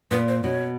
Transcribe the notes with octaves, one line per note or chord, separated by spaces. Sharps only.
A#2 B4
C5
B2 C#5